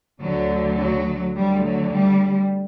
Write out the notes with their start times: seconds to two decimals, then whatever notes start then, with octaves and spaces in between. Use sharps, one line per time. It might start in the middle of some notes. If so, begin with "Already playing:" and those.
0.22 D2 D3 F#3
0.79 F#3
1.36 D2 D3 G3
1.64 F#3
1.92 G3